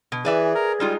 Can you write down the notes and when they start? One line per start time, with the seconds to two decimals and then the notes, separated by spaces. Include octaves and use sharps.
0.12 B2
0.25 E3 G#4 B4 D5 E5
0.55 A#4
0.80 G3 G#3 D#4 F4